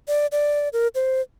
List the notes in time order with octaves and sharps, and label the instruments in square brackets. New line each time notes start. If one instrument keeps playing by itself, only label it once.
[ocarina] D5
D5
A#4
C5